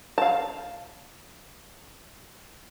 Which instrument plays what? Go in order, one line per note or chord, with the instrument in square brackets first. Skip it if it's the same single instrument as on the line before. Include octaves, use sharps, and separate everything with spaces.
[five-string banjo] F5 A5